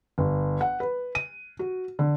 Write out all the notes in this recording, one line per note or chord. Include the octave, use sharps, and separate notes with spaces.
G1
F#5
B4
D#7
F#4
D3